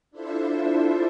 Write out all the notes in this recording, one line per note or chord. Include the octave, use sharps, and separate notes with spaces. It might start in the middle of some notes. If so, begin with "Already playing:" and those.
D4 E4 F4 A4 C5 E5